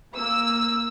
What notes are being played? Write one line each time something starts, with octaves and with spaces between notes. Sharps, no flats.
A#3 E6